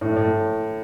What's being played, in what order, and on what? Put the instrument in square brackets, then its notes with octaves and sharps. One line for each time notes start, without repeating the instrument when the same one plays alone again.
[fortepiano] A2
A2